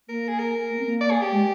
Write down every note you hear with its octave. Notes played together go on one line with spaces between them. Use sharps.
A#3 A#4
G#4
A#4
A#3
C4
A#3
D5
G#4
G4
G#3